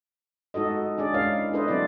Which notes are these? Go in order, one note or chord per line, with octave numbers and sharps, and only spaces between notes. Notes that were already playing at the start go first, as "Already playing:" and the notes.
G#3 D#4 F#4 A4 D#5
C#4 D4 G#4 D5
G#3 C#4 D4 E4 A#4 F5
D4 E4 A4 B4 C5 D#5
F#3 C4 D#4 E4 D5